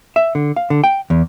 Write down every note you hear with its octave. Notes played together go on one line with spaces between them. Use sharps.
E5
D3
F5
D3
G5
E2